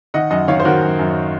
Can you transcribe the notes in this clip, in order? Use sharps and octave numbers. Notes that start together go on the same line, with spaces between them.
D#3 D#5 F#5
F#2 D#5 F#5
D#3 C#5 F5
C5
D#3 F#4 A#4
F#2
F#2